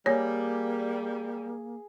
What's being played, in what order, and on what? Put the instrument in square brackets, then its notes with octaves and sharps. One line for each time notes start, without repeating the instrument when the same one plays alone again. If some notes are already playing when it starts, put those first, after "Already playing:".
[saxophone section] G3 [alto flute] A#3 [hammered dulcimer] G#4 [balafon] C#5